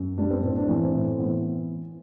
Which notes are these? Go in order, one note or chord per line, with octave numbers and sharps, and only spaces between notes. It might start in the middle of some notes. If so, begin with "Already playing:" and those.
Already playing: F#2
G3 D4
C4
A2 C4
D4
E3 C4
A2
E3 B3